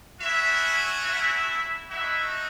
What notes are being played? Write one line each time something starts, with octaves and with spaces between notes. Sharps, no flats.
A3 C#4 E4 F#4 E5
E4 E5
A3 D#4 E4 F#4 E5